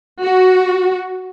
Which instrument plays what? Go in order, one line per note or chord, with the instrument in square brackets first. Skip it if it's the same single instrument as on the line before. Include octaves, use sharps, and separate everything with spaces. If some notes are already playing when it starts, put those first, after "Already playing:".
[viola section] F#4